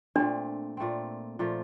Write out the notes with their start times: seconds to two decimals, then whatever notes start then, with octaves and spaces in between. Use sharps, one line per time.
0.15 A#2 A3 C4 D4
0.77 A#2 A3 C4
1.39 A#2 F3 A3